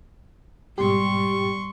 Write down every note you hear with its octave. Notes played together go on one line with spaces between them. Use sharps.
G#2 B2 G3 G4 C6 C#6